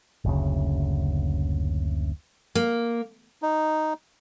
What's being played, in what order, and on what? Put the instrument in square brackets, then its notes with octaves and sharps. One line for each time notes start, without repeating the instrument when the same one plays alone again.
[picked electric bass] F#1 D2 C#3
[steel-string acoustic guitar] A#3
[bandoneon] D#4